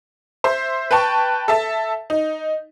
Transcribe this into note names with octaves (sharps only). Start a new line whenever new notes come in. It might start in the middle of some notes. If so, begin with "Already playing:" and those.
C5 E5
B4 G5 A5 C#6
A4 E5 A5
D#4